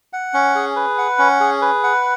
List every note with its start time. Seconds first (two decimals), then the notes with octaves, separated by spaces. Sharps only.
0.13 F#5
0.34 C#4
0.55 G#4
0.76 B4
0.98 F#5
1.19 C#4
1.40 G#4
1.62 B4
1.84 F#5